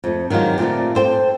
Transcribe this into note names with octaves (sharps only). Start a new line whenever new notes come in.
F2 A3
D#3 F#3 G#3 F4 G4
A#2 A3 C4 F4 D5
A4 C5 G5